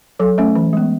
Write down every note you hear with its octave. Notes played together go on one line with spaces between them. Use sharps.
F#3 A4
A3 C#4
E3
G#3 B3